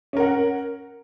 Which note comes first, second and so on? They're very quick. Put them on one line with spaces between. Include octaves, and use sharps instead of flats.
C#4 A#4 F#5